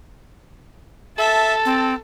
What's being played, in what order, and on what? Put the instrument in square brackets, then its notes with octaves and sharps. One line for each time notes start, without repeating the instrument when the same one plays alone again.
[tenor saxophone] A4 [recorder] E5 [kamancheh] A5
[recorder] C4